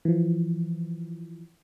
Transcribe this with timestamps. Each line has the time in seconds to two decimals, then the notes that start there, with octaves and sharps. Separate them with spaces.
0.05 E3 F3